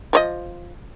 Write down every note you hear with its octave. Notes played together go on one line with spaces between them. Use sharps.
F3 C#5 D#5